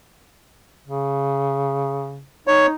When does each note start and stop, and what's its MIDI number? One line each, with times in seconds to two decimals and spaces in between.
0.87 2.24 49
2.47 2.74 63
2.47 2.67 73